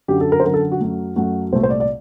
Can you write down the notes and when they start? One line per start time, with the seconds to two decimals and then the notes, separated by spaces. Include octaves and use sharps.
0.08 F#2 D3 F#3 G4
0.21 A4
0.32 A#4
0.40 C5
0.45 F#2 D3 F#3 A#4
0.54 A4
0.72 F#4
0.81 F#2 F#3 A3
1.16 F#2 F#3 A3 F#4
1.53 C2 A#2 A3 C5
1.63 C5
1.70 D5
1.80 D5